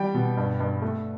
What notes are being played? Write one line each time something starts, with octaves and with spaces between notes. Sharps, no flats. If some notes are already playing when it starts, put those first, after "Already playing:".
Already playing: G3 G5
B2
G2
G2
A3